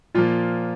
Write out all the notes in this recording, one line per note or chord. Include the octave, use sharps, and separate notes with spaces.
A#2 F3 A#3 F4